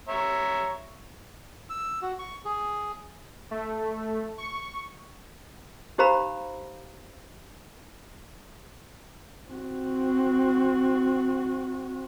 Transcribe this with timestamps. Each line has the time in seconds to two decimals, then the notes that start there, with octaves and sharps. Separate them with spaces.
0.09 C#5 E5 A#5
1.70 E6
2.02 F#4
2.19 C#6
2.45 G#4
3.51 A3
4.38 C#6
5.98 D#4 G4 C5 F5 A#5 B5
9.49 C4 F#4